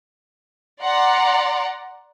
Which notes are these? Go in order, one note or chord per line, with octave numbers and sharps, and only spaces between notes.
D5 F#5 A#5 C6